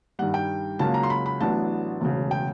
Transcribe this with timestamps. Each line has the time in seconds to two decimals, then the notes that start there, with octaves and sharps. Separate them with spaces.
0.19 G2 D#3 G3 F#5
0.34 G5
0.79 C#2 C#3 F#3 A#3 A5
0.94 A#5
1.03 C6
1.10 B5
1.26 B5
1.40 A1 A2 F#3 B3 D4 A5
2.01 E1 D2 C#3
2.31 G5